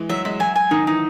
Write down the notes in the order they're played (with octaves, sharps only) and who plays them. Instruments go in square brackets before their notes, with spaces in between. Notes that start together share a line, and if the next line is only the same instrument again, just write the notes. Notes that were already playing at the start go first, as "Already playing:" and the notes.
Already playing: [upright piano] E3 G#3
[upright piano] F#3 [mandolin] E5
[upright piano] G#3 [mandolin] E5
[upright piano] F#3 [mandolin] G#5
[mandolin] G#5
[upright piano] D#3 [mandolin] D#4
[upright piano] E3 [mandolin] D#4